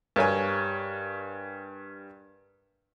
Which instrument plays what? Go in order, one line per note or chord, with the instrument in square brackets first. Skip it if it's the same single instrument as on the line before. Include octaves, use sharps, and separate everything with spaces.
[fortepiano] G2 A#4 C#5 G#5